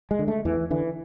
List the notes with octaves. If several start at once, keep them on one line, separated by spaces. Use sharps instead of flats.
G#3
D3
A3
E2 E3
D3 E3